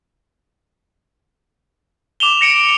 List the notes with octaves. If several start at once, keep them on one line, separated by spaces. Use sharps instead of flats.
D6 E7 F7 G7
A#6 C#7 D7